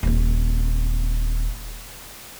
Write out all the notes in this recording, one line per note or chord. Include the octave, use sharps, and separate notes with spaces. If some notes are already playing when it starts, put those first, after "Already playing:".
D#1 C4